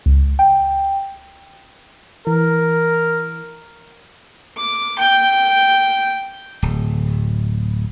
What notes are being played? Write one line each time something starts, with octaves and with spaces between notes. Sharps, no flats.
C#2
G5
E3 A#4
D6
G5
D1